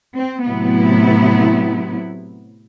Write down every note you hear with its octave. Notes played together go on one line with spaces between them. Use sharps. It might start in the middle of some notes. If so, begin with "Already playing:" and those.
C4
A2 C3 F#3 B3 E4